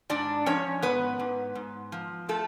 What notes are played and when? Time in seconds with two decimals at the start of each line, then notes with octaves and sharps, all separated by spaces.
0.10 G#2 D4 D5
0.46 F3 C#4 C#5
0.82 G#2 B3 B4
1.19 G#2
1.55 G#2
1.92 F3
2.28 F3 A3 A4